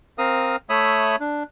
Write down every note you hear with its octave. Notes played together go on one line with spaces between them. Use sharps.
C4 A#4 F5 D#6
A3 C#5 E5 B5 D#6
D4